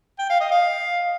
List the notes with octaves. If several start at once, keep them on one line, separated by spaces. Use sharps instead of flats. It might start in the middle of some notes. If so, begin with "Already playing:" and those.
G5
F5
D#5
F5